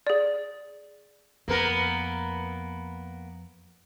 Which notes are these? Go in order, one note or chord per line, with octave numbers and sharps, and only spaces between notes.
G#4 D5
F2 A#3 B3 A#4